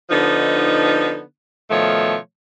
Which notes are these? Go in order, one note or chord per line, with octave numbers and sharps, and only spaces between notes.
D3 F3 B3 D#4
B2 D#3 F3 A3 C#5